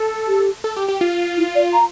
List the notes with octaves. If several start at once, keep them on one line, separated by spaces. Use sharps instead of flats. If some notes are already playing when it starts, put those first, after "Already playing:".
Already playing: A4
G4
A4
G4
G4
F4
E4
D5
A#5